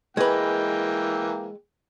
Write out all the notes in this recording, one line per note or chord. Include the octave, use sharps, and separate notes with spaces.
E3 G#3 A#3 B4 G5